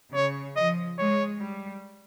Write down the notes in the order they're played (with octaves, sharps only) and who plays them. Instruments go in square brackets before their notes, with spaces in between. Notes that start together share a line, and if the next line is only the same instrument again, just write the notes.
[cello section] C#3 [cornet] C#5
[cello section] F3 [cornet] D#5
[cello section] G#3 [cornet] C#5
[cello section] G3